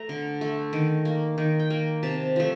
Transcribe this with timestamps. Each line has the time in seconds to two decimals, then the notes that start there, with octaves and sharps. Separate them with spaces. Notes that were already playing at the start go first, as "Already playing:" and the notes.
Already playing: A3 A#5
0.09 D3
0.41 A3
0.73 D#3
1.05 A#3
1.38 D#3
1.60 G5
1.70 A#3
2.03 C3 A5
2.36 F3 A3